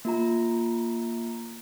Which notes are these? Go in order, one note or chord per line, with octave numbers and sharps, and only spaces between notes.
A#3 F4 A#5